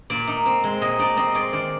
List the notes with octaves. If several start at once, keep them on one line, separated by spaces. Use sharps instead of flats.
A#2 D5
D#4
C4
G#3
A#2 D#5
D#4 D5
C4 D#5
G#3 D5
D#3 D5